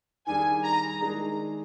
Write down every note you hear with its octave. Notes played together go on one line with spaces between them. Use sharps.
D#3 G3 D4 G#4 G#5
A#5
D#3 G#3 D4 G#4